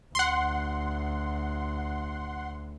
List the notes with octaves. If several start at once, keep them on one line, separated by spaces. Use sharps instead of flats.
D2 F#5 C6